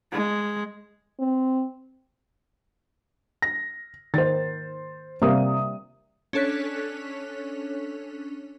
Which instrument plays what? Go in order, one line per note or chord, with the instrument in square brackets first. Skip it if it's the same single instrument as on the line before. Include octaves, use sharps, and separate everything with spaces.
[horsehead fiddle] G#3
[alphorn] C4
[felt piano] A#6
[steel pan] D#3 [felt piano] C5 A6
[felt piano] C3 D#6 [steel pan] G3 A#3
[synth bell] C#4 D4 A4 C#5 F#6 B6